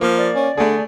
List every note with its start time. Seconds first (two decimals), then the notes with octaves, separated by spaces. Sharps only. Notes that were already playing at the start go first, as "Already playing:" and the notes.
0.01 F3 A#3
0.18 D5
0.36 C#4
0.57 D3 A3 G#4